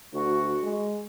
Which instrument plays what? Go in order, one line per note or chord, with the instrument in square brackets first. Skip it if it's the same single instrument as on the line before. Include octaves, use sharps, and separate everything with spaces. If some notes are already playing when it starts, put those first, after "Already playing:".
[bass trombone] D2 [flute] F#4
[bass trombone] G#3